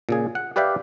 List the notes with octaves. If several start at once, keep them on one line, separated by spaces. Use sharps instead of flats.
A#2 C#3 G#4
F#5
G4 B4 D5 E5 F5 G5